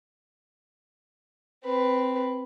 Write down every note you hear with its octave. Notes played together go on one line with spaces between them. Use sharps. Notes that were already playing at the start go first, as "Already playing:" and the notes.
C4 B4